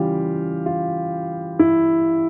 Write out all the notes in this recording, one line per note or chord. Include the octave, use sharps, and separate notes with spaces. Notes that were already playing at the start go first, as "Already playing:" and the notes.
Already playing: C#3 E3 G3 F4 G4
F4
E4